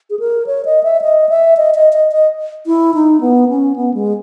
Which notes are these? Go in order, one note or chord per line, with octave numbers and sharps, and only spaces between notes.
G#4
A#4
C#5
D#5
E5
D#5
E5
D#5
D#5
D#5
D#5
E4
D#4
B3
C#4
B3
G#3